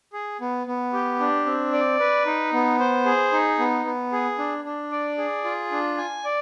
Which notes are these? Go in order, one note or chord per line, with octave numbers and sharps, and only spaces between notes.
G#4
B3
B3
G4
D4
C4
D5
B4
D#4
B3
C5
G#4
D#4
B3
B3
G#4
D4
D4
D5
G#4
F4
D4
G#5
D5